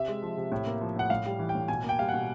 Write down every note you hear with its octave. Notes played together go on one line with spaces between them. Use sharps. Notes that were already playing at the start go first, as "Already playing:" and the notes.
Already playing: C3 E5
G#3
F3
C3
A2
A#3
F3
A2 F#5
A2 F5
G3
E3
G5
A2
B2 G#5
A#3 G5
G3 F5
B2 F#5